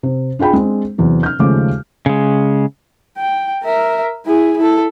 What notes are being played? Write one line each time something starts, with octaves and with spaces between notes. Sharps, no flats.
C3
D4 F4 G#4 G5 B5
G#3 C4 D4
E2 C3 F#3
F6 G6
D#2 C#3 F3 G#3 A3 D6
C#3 G#3
G5
A#4 E5
E4 G#4
E4 A4